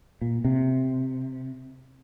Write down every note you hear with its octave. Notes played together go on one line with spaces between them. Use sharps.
A#2
C3